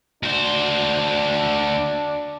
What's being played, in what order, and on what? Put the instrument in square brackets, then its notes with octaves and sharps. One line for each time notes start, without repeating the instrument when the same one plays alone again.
[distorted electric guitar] D2 C5 [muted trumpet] D4